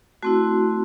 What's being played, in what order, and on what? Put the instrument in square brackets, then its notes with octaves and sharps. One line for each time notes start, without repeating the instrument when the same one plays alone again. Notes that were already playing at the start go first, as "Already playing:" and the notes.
[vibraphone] A3 C4 E4 F#4